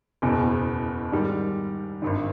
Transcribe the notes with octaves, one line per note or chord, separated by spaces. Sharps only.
F#1 E2 B2
G#2 D#3 G3
G#1 G2 D#3